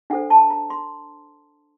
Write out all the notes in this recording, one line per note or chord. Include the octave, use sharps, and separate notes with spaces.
D4 A4 C5 F#5
A5
A#5
C6